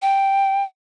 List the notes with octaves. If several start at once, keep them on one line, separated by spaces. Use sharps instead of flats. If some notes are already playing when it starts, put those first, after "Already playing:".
G5